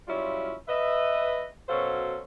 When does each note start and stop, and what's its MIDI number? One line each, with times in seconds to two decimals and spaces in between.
0.08 0.53 54
0.08 0.53 55
0.08 0.53 61
0.08 0.53 64
0.08 0.53 65
0.68 1.47 71
0.68 1.47 75
0.68 1.47 76
1.69 2.20 47
1.69 2.20 54
1.69 2.20 61
1.69 2.20 69
1.69 2.20 72
1.69 2.20 77